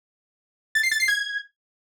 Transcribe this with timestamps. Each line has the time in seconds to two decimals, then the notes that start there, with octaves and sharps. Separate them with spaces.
0.75 A6
0.83 C7
0.92 A6
1.00 C7
1.08 G#6